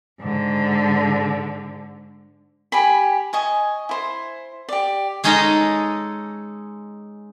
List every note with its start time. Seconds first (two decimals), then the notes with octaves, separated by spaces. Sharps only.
0.21 G#2 D3
2.72 G4 G#5 B5
3.33 D#5 G#5 C#6
3.89 E4 C5
4.69 G4 D5
5.24 G#3 C#4 D#4 A4 D#5 A#5